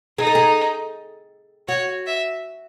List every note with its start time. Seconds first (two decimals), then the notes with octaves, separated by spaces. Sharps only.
0.18 D#4 G#4
0.27 A4
0.35 G#4
1.68 F#4 C#5
2.07 E5